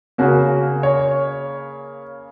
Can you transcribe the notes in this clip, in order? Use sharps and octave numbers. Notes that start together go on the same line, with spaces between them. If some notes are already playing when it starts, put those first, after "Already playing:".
C#3 A#3 C#4 F#4
C#5